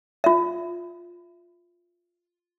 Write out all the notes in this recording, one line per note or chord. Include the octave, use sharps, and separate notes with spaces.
F4 E5